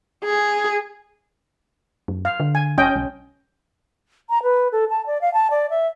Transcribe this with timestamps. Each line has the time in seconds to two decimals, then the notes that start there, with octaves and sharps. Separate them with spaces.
0.25 G#4
2.08 F#2
2.25 F5
2.40 D3
2.55 G#5
2.78 F1 C#4 D#5 G5
2.95 B1
4.30 A#5
4.43 B4
4.72 A4
4.90 A5
5.07 D5
5.21 F5
5.34 A5
5.51 D5
5.70 E5